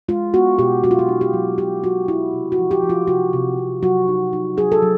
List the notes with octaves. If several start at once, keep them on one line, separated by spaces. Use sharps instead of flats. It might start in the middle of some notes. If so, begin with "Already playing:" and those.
G#3 F4
B3 F#4
B2 G4
F#3 F#4
F4
F#4
D#4
G4
F#3
B2 G4
F#3 F#4
F#3 E4
C3
F#4
F3
G4
F3
F4
C3 F#4
C3
C3
F#3 F#4
D#4
D#4
F#3 G#4
A4
F#3